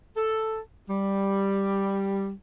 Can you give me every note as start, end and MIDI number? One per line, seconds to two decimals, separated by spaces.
0.17 0.60 69
0.89 2.31 55